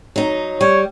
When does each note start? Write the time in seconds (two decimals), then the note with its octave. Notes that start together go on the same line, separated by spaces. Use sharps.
0.16 F#3 D#4
0.61 G3 C#5